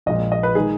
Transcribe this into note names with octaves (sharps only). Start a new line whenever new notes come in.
A#1 A#2 G#3 D#5
D#5
B4
D#3 G#3 G#4